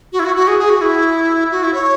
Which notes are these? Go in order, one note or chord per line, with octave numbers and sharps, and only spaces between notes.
F#4
E4
F#4
F#4
G#4
G#4
F#4
E4
F#4
E4
C#5